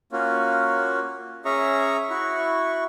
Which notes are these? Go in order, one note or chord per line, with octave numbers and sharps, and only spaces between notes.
A#3 C#4 F4 F#4
C#4 G#4 E5 A#5 C#6
E4 F#4 C#6